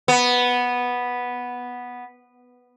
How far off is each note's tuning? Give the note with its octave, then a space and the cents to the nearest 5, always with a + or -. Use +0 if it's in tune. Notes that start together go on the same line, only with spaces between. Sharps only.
B3 -5